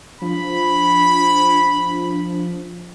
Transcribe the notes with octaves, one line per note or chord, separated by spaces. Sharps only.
F3 D4 B5